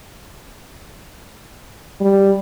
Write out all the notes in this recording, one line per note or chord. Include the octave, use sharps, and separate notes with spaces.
G3